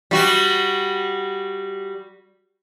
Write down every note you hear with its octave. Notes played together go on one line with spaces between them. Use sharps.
G3 F#4